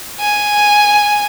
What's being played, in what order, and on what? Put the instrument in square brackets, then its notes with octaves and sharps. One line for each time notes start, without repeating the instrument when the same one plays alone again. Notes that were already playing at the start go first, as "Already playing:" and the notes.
[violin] G#5